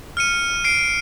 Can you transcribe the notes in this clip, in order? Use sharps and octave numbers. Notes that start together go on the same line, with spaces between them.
F6 C#7 D#7
C7 D7